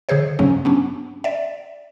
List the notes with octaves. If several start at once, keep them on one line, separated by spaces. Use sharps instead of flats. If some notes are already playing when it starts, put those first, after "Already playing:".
D3 G#4 A4 C5 C#5
G2 C#3 F#3 A#3 C#4
B3 C#4 D4
D5 E5